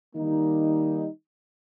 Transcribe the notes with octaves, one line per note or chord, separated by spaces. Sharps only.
D#3 G3 A#3 D#4